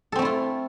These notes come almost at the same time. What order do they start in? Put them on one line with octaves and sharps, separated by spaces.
A4 C4 A3 E4 F4